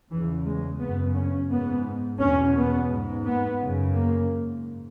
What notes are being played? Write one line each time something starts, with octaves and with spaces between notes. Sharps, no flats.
E2 C#3 E3
G#3
F#2 C#3 B3
C#4
G#2 B3
E2 B2 C#4
B3
G#2
B3
F#2 C#3
A#3
G#2